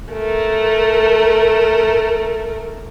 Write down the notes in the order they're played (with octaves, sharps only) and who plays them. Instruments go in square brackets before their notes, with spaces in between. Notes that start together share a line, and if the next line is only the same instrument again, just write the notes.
[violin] A3 A#4